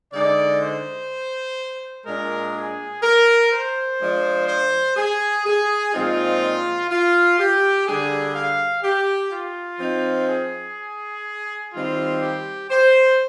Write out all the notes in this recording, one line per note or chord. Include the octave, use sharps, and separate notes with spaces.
D3 G#3 D#4 D5
C5
A#2 G#3 D4 A#4
G#4
A#4
C5
F3 G#3 D4
C5
G#4
G#4
A#2 F3 G#3 C4 D#4 F4
F4
G4
D3 G3 D4 G#4
F5
G4
F4
F3 C4 D#4
G#4
D#3 G3 C4 D#4 F4
G4
C5